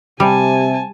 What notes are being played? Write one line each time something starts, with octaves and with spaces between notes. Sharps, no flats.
C3 G3 G#5 A5